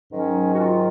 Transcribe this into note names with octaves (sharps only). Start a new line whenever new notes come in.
G#2 D#3 F#3 C#4
F#4
F4